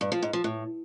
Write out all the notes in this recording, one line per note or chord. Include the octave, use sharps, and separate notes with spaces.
G2
F3
G#2
F3
A2